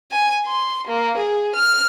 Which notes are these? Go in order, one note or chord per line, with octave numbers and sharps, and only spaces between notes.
G#5
C6
A#3
G#4
F6